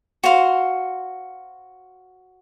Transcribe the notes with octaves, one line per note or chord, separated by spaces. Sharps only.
F#4 C5 F5 C6